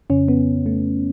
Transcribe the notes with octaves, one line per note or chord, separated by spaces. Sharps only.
F2 C#3 C#4
B3
A3